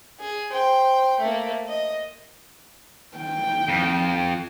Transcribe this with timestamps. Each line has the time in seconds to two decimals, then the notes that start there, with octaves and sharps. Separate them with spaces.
0.20 G#4
0.51 C5 G5
1.19 A3 A#3
1.68 D#5
3.18 G5
3.68 F2